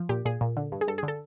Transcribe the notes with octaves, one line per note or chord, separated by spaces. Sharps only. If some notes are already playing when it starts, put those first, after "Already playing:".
Already playing: F3
A#2 G4
A#2 G#4
A#2
D3
G2
G#4
G2 A4
D3 G#4
A4